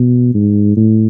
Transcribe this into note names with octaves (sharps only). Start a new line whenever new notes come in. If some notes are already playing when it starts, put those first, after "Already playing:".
Already playing: B2
G#2
A2